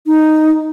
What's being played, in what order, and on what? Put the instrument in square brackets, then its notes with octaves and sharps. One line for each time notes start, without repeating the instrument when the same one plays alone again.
[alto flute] D#4